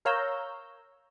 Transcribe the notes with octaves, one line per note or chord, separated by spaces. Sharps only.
A#4 C#5 F5 A#5 E6 G6